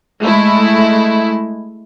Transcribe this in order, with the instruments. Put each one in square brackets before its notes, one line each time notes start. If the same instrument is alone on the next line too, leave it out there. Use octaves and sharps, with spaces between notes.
[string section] G#3 A3 E4